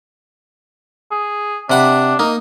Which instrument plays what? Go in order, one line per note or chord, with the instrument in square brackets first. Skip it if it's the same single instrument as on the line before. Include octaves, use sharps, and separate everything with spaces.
[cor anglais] G#4
[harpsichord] C3 F#5 B5 [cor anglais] D4
[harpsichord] A#3 D#4 [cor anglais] D#5